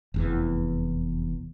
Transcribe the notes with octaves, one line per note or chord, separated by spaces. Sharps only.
F1 E2 E3